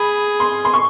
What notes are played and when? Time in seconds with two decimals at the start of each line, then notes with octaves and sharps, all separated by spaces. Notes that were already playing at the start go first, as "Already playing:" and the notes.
Already playing: G#4 B5
0.40 C6
0.65 C6
0.73 C#6